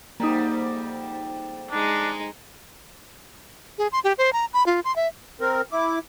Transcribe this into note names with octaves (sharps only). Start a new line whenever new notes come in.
F2 G#2 G3 A#3 D#4
G#3 D4 D#4
G#4
C6
G4
C5
A#5
B5
F4
C6
E5
C4 A#4
E4 D6